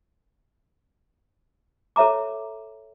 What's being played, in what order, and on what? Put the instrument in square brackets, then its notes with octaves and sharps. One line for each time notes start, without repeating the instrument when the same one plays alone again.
[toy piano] A4 C#5 E5 A#5 D6